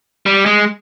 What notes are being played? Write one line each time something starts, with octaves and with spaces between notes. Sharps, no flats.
G3
G#3